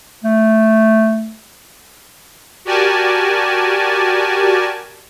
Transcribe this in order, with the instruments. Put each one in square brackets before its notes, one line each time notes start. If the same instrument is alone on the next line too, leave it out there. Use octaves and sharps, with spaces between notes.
[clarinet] A3
[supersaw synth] F#4 G4 A#4 D5 G#5 A5